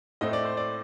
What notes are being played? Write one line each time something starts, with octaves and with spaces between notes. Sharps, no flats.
A2 A3 C4 D#5
D5
C5
D5